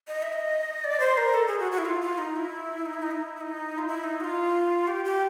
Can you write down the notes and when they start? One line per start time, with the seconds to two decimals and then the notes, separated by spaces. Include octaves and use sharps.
0.08 D#5
0.22 E5
0.33 D#5
0.84 D5
1.00 C5
1.17 A#4
1.34 A4
1.47 G#4
1.60 F#4
1.72 F#4
1.78 E4
1.85 F4
2.01 F4
2.18 D#4
2.36 E4
2.86 D#4
2.94 E4
3.03 D#4
3.11 E4
3.36 E4
3.41 D#4
3.78 F4
3.87 E4
4.04 D#4
4.20 F#4
4.24 F4
4.88 G4
5.05 G4